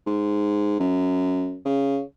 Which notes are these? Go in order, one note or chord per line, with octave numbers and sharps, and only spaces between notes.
G#2
F#2
C#3